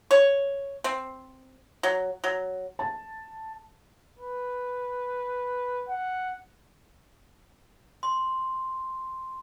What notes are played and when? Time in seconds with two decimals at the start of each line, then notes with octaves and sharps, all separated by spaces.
0.11 C#5
0.84 C4
1.83 F#3
2.24 F#3
2.79 A5
4.19 B4
5.88 F#5
8.03 C6